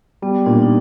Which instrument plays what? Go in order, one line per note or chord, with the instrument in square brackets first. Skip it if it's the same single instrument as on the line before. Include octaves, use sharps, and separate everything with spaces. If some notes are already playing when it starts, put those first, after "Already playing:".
[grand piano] G3 [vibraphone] B3
[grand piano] A#2 [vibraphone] D4
[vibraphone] D#4